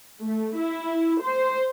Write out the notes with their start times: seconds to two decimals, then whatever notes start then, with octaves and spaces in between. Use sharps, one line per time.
0.21 A3
0.57 E4
1.22 C5